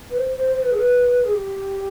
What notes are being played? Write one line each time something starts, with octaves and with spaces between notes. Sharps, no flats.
B4
C5
C5
C5
B4
G#4
B4
G#4
G4